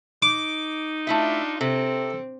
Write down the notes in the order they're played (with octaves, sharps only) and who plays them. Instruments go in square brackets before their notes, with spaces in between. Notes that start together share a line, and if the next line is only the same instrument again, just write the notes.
[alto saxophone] D#4 [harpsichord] D6
[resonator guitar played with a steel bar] A3 E4 E5 [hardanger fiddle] D4 F4
[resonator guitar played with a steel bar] C3 [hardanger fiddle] C4 [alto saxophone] A4